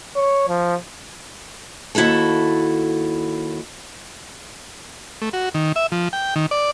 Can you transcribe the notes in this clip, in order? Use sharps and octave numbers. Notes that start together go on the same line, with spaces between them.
C#5
F3
D#2 E4 F#4 A4 A5
A3
F#4
D#3
E5
F3
G5
D#3
D5